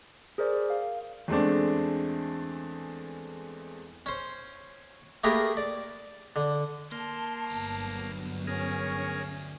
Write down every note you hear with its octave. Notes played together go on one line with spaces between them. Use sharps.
G#4 A#4 C5 D5
F5
E2 G#3 A3 C4 D4
C#4 C5
A3 A#3 G4 G#4 A#4 B4
D5
D3
A#3 A5 C6
G1 D2 F#3 B3 A#5
C#4 G#4 A#4